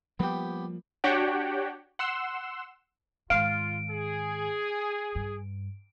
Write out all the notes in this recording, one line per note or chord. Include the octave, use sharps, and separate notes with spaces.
F3 G3 A#3 B3 G4
D4 F#4 G4 C#5 F#5 G5
F#5 C6 E6 E7
G#2 D#3 F4 F5 D7
G#4
G2